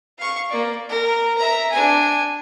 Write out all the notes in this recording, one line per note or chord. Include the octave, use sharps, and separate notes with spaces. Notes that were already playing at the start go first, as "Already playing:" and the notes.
F5 C#6
A#3 D5
A#4
E5 A#5
D4 G#5